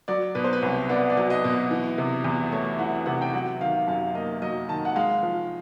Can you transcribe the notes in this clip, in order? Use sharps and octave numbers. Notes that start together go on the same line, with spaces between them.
F#3 D5
B2 B4
C5
B4
C2 C#5
B3 D5
D5
F#3
D#5
B2
E3
C3
E2
A3 C#5
E3 F#5
C3 F#5
G5
F#3 F#5
D#3 F5
F#2 F5
A#3 D#5
F#3 D#5
D#3 A5
F#5
G#3 F5
F3